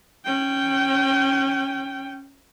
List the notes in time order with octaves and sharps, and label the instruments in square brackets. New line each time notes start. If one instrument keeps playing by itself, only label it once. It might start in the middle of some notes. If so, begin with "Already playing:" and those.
[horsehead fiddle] C#4 G5